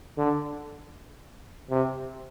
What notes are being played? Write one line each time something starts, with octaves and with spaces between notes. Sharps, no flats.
D3
C3